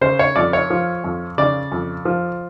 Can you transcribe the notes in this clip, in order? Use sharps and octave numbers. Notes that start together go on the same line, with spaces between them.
C#3 C5
C#5
F2 D5
C#5
F3
F2
C#3 D5
F2
F3